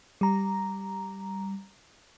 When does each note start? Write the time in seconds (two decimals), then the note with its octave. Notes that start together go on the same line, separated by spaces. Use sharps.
0.21 G3 A#5